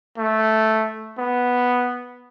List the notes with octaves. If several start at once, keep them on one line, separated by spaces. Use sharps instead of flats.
A3
B3